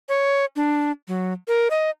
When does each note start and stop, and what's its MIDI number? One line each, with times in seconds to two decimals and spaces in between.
0.09 0.45 73
0.56 0.91 62
1.08 1.33 54
1.48 1.68 70
1.70 1.90 75